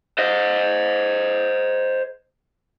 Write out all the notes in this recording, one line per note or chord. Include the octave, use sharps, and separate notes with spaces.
C5 D#5